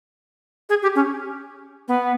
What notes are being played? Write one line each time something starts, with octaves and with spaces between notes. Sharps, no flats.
G#4
G4
C#4
B3